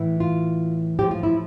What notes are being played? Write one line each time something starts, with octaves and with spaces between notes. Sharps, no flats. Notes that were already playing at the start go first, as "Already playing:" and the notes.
Already playing: A2 E3
F4
A2 F3 G4
F4
E4